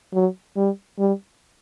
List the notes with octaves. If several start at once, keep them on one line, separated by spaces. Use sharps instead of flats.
F#3
G3
G3